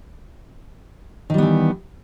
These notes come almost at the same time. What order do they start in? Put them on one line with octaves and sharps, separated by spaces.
D#3 G3 B3 E3